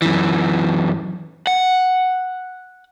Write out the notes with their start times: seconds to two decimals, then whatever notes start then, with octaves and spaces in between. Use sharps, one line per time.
0.02 F#2 E3
1.47 F#5